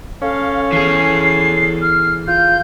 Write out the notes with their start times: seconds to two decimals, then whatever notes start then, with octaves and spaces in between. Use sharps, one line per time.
0.22 C#4 A4 F5
0.72 E3 G#4 C7
1.81 F6
2.27 F4 G6